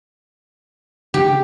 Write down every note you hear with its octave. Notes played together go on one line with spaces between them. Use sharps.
C#3 G4